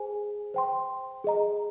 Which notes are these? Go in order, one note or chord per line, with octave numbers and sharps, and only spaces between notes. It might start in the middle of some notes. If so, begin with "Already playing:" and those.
Already playing: G#4 C5 G#5
C5 G5 C6
G#4 D#5 A#5